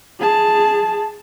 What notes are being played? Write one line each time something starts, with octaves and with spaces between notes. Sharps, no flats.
G#4 A5